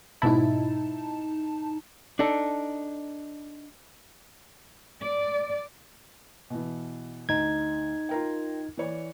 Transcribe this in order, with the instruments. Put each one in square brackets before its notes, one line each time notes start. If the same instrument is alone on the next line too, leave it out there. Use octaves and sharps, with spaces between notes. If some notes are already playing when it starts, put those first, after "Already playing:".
[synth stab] G#2 B2 E4 [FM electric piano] D#4 A5
[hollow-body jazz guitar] D4 D#4 A4
[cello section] D5
[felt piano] B2 E3
[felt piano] D2 [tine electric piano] D#4 G#6
[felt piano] F4 A#4 G5
E3 C#5 D5